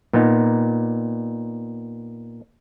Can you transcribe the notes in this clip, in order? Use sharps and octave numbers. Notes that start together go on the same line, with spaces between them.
A#2 B3 D#4